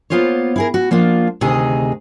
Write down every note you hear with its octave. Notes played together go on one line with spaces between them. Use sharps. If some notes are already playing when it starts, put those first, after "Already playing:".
A#3 B3 C#4 F4 C5 C#5
E4 G#4 A#4
F#4
F3 A#3 D4 F4
D2 C3 D#3 D#4 G#4 D#5